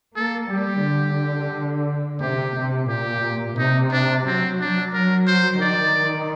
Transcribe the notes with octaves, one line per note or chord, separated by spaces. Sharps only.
A#3 A4
G3 G4
D3
C3 G4
C3
A#2 G4
C3 D#4
D4
F#3 C4
D4
F#3 A#4
C5
D#3 D5